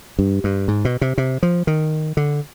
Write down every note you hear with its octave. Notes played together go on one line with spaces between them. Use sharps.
G2
G2
G#2
B2
C3
C3
F3
D#3
D3